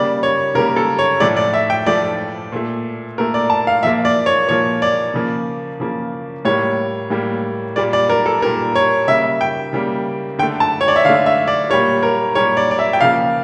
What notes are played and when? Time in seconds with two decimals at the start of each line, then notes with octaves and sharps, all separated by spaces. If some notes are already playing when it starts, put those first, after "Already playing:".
Already playing: C#3 G3 A#3 D5
0.23 C#5
0.55 C#3 G3 A#3 A#4
0.76 A4
0.99 C#5
1.20 A2 F3 A3 D5
1.37 D5
1.54 E5
1.70 G5
1.86 A2 F3 A3 D5
2.52 A#2 A3
3.18 A#2 A3 A#4
3.34 D5
3.50 A5
3.67 F5
3.83 A#2 F3 A#3 E5
4.05 D5
4.26 C#5
4.48 A#2 F3 A#3 C#5
4.82 D5
5.14 C#3 F3 A#3
5.80 C#3 F3 A#3
6.45 A2 G3 A#3 C#5
7.10 A2 G3 A#3
7.76 A#2 G3 A#3 D5
7.93 D5
8.10 A#4
8.26 A4
8.42 A#2 G3 A#3 A#4
8.75 C#5
9.07 C#3 G3 A#3 E5
9.41 G5
9.73 C#3 G3 A#3
10.39 D3 G5
10.42 A3
10.60 A5
10.81 C#5
10.88 D5
10.96 E5
11.05 D3 F5
11.09 A3
11.26 E5
11.48 D5
11.70 A#2 G3 A#3 C#5
12.03 A#4
12.35 A#2 G3 A#3 C#5
12.57 D5
12.71 D5
12.79 E5
12.93 G5
13.01 C#3 F3 A#3 F5